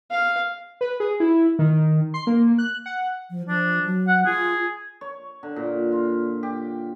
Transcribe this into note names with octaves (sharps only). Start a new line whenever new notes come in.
F5
B4
G#4
E4
D#3
C6
A#3
F#6
F#5
F3
F3 D4
F#3
F#5
F4 G#4
C#5
D3
A#2
F4
G4